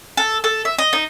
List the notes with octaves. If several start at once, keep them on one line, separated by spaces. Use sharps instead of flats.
A4
A4
E5
D#5
D#4